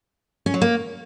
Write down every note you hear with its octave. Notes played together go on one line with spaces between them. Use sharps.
C#4
F#3
A#3